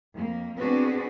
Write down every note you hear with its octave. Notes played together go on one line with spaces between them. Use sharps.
F2 A#3
B3 C4 D4 F#4 G#4 B4